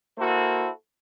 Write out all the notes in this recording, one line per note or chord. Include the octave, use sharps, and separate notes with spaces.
A#3 E4 F#4 A4 C5